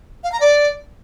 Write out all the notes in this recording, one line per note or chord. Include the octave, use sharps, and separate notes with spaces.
F5
A#5
D5